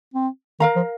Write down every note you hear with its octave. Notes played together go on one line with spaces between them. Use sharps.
C4
D#3 A#4 F5 A#5
F3